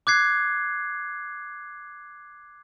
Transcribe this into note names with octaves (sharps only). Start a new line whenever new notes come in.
D6 F#6 G#6 C7